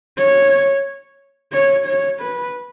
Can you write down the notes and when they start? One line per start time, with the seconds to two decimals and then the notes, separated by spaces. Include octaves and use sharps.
0.17 C#5
1.53 C#5
1.86 C#5
2.20 B4